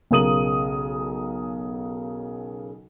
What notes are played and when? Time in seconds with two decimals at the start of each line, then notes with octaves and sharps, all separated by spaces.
0.11 B1 C#3 A#4 D#6 D#7 F#7